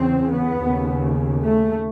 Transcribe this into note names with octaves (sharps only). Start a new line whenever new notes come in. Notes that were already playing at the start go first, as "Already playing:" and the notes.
Already playing: E2 C#3 C4
B3
D#2 C#3
A3